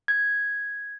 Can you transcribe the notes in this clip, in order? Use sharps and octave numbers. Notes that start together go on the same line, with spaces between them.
G#6